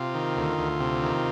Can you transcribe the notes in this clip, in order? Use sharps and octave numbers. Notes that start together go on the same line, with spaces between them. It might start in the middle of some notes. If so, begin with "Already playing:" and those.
Already playing: C3 F4
D#3
D2
D2
C3
D#3